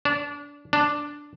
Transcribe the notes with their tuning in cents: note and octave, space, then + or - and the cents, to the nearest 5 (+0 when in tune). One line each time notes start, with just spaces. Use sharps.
D4 -25
D4 +0